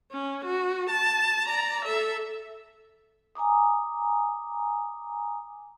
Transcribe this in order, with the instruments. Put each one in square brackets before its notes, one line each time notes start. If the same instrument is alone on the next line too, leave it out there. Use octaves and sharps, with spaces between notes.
[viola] C#4
F#4
A5
D5 A#5
A4 E5
[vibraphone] G#5 A#5 D6 D#6